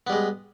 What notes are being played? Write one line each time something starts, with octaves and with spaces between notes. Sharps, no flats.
G3 G#3 B3